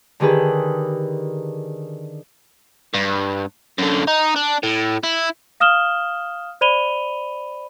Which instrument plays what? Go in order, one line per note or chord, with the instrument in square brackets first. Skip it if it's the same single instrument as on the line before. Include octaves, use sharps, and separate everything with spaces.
[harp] D3 D#3 G4 G#4 B4
[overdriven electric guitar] G2
F#2 D3
D#4
D4
A2
E4
[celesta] F5 D#6 F6 E7 G7
C5 D5 B5 D#7 F7 G7